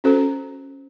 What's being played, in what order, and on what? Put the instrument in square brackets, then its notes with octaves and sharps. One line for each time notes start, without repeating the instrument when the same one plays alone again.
[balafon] C#4 F#4 A4 C5